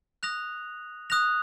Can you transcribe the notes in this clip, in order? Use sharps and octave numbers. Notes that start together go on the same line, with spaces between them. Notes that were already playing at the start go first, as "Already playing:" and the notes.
D#6 F#6 A#6 F7
D#6 F#6 A#6 F7